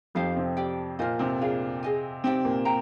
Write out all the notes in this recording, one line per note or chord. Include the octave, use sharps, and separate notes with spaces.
F2 F3 D#4 G4 C5 F5
C3 C4
G4 D5 G5
A#2 A#3 F4 C5 D#5
C3 C4
D4 F4 G#4
G#4 D#5 G#5
C3 C4 D#4 G4 D5 G5
A#2 A#3
G5 A#5